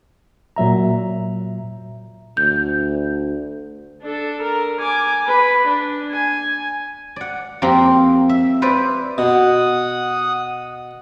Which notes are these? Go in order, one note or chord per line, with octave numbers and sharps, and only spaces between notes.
A#2 F#3 E5 A#5
D2 G6
D4 A4
A#4
G#5 D6
B4
D4
G#5
D5 F#5
F2 A#3 C4 G4 A#4 C5
E5
B4 C5 D5 E5
B2 F#5 D#6